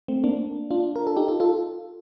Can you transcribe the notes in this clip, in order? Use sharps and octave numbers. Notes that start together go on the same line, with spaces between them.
A3 C4
A#3 D4
D4 F4
A#4
A4
D#4 G4
F4 A4
F4 A4